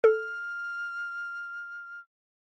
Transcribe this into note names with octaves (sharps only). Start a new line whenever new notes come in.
A4 F6